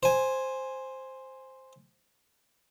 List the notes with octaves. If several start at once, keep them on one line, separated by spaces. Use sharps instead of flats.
C5 G#5